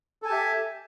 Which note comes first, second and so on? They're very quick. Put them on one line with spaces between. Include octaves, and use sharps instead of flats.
A4 G#5 A5 G4 E5